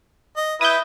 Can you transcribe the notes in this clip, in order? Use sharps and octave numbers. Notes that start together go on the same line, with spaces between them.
D#5
E4 B4 D#6 G6